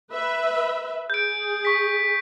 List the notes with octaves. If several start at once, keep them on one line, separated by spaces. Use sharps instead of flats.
B4 E5
G#4 G6 D7
C#6 B6